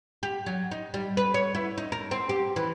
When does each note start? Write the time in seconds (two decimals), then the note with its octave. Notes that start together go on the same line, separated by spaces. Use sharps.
0.23 G4
0.46 F#3
0.71 D#4
0.94 G3
1.17 B4
1.34 C#5
1.55 E4
1.78 D#4
1.92 A#4
2.11 C4
2.29 G4
2.56 E3